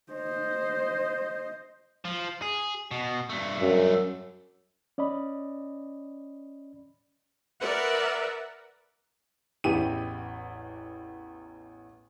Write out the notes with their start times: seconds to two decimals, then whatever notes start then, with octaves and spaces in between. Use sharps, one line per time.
0.12 C5 D#5
2.05 F3
2.42 G#4
2.91 B2
3.29 G2 A3
3.61 F#2
4.98 C#4 D5 D#5 B5
7.60 A#4 B4 D5 E5 F#5
9.64 A1 E2 E4 G4 D#7